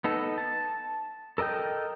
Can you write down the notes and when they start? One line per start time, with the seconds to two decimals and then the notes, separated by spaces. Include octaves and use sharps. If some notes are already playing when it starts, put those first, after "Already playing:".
0.04 B3 D#4 A4
0.38 A5
1.38 A4 A#4 D#5 G5 G6